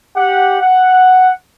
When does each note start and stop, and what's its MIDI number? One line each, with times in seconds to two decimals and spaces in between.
0.16 0.61 67
0.16 0.61 78
0.61 1.32 78